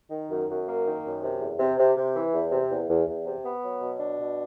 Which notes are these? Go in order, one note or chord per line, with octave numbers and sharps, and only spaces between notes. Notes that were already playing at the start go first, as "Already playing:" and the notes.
D#3
F#2
F#2
A#3
D#3
F#2
C3
E2
C3
C3
C3
E3
E2
C3
E2
E2
E2
C3
B3
F#3
B2
D4
B2